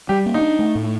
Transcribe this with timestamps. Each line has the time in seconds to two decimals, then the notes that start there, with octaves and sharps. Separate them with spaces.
0.09 G3 G4
0.26 A#3
0.34 D#4
0.41 D4
0.59 A3
0.75 A2